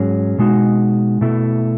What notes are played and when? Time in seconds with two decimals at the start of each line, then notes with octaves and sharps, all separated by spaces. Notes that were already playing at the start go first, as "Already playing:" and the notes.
Already playing: G#2 F#3 C#4 G#4
0.38 B2 G#3 D#4 F#4
1.21 B2 A3 E4